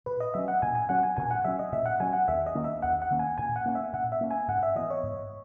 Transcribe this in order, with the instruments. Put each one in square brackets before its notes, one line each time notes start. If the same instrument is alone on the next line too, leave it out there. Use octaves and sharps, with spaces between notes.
[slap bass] A#2 [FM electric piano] B4
[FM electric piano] D#5
[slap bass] F#3 C#4 [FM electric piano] E5
[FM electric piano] F#5
[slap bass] A#2 [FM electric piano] G#5
[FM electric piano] G#5
[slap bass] F#3 C#4 [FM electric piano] F#5
[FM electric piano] G#5
[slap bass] A#2 [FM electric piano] G#5
[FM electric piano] F#5
[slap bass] F#3 C#4 [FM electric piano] E5
[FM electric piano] D#5
[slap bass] A#2 [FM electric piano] E5
[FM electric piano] F#5
[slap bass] F#3 C#4 [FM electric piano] G#5
[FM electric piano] F#5
[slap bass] D#2 [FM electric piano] E5
[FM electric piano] D#5
[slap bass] D#3 A#3 C#4
[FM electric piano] E5
[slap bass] D#2 [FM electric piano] F#5
[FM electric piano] F#5
[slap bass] D#3 A#3 C#4
[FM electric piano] G#5
[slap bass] A#2 [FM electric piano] G#5
[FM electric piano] F#5
[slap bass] A#3 C#4
[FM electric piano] E5
[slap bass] A#2 [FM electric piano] F#5
[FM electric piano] E5
[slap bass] A#3 C#4
[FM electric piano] G#5
[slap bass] G#2 [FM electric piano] F#5
[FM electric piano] E5
[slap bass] E3 B3 [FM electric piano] D#5
[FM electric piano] C#5
[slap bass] G#2